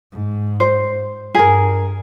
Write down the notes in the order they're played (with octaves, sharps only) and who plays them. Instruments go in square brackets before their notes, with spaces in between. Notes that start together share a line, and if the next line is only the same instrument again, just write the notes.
[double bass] G#2
[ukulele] C5
[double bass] G2 [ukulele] G#4 A#4